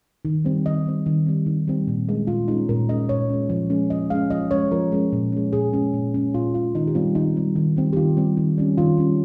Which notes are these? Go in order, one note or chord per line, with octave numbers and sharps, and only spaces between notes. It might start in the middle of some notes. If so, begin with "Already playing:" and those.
D#3
G3 C4
D#3 D#5
G3 C4
D#3
G3 C4
D#3
G3 C4
A#2
G#3 C#4
A#2 F4
G#3 C#4 D#4
A#2 A#4
G#3 C#4 D#5
A#2 C#5
G#3 C#4
F3
G#3 C#4
F3 D#5
G#3 C#4 F5
F3 D#5
G#3 C#4 C#5
F3 A#4
G#3 C#4
A#2
G#3 C#4
A#2 G#4
G#3 C#4
A#2
G#3 C#4
A#2 F4
G#3 C#4 F4
D#3 D#4
G4
G3 C4 F4
D#3 D#4
G3 C4
D#3
G3 C4
G4
D#3 F4
G3 C4
D#3
G3 C#4
D#3 F4
G3 C#4